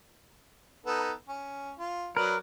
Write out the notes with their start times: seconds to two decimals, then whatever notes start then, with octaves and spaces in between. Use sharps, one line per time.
0.86 B3 D#4 A4
1.28 C#4
1.79 F4
2.17 F#3 A#4 B4 D5